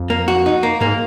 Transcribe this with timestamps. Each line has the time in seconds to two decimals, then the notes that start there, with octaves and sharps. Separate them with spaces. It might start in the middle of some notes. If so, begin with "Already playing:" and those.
Already playing: F2
0.10 A#3
0.28 F#4
0.46 D#4
0.63 A#3
0.81 G#2 A#3